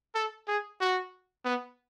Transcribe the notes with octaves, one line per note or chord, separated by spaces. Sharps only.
A4
G#4
F#4
B3